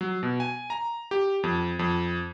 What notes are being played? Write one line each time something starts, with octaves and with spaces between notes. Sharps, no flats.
F#3
B2
G#5
A#5
G4
F2
F2